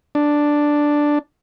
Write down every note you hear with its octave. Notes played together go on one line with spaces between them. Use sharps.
D4